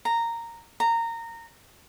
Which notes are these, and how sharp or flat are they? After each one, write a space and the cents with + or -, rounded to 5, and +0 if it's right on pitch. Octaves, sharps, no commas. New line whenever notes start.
A#5 -10
A#5 -20